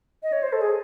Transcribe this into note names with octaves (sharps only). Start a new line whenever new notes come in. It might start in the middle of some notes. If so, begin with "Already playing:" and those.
D#5
C#5
C5
A4
G#4